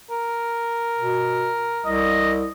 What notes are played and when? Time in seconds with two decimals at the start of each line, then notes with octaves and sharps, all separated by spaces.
0.10 A#4
0.99 B2
1.86 C2 D#5